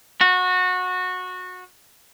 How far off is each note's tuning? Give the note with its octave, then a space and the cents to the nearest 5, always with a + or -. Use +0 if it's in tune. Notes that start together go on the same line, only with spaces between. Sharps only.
F#4 -20